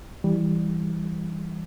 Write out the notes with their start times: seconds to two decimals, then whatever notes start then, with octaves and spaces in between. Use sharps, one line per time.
0.24 E3 G3